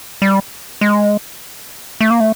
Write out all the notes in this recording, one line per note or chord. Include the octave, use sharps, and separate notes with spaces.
G3
G#3
A3
A#3
A3